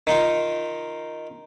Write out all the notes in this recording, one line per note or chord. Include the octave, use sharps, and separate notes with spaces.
D#3 D#4 F4